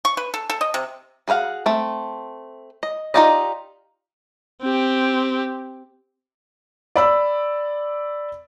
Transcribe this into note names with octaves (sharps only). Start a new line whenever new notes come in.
C#6
B4
A4
A4
D#5
C3
F#4 G#4 B4 F5 F#5
A3 C4
D#5
D#4 F4 G4 D5 D#5
C4 G4
D5 B5 E6